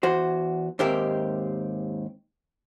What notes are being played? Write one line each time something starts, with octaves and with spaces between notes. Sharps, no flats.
E2 F#4 C5
D#2 G#2 C4 G4 A#4 E5